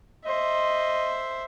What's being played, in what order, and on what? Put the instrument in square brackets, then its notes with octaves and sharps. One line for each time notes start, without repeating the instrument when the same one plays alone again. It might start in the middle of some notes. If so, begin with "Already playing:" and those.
[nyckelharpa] C5 E5 [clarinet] D#5